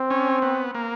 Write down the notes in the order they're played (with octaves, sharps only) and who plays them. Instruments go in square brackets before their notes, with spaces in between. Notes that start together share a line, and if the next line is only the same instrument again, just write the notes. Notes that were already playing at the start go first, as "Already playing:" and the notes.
Already playing: [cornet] C4
[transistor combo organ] C#4
B3
A#3